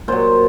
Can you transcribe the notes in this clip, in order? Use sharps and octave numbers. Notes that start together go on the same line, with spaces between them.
A#2 F#3 C5